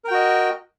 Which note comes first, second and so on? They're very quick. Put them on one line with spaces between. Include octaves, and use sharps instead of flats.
A#4 G5 F#4 D#5